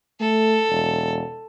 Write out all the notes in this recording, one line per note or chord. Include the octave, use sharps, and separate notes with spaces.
A3 A4
E1